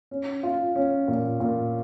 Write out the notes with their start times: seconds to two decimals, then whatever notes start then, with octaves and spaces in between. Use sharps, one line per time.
0.11 C#4
0.43 F4
0.76 C#4
1.08 A#2
1.40 A#2